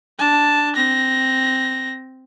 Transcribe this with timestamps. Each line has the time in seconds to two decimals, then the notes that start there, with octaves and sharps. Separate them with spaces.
0.19 D4 A5
0.75 C4 A#6